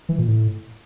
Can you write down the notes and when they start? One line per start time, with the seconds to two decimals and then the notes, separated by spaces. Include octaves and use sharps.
0.09 E3
0.18 A#2
0.28 A2